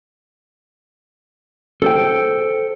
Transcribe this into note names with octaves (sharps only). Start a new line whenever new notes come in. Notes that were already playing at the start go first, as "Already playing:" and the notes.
A4 C5 G5